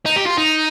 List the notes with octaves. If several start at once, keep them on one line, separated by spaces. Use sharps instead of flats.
D#4
G4
F4
D#4